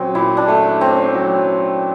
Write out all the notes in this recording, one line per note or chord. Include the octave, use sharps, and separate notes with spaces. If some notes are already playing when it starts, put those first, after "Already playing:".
Already playing: A#2 F#3 C4 C#4
A#2 E4
D4
A3
C4 C#4
F#3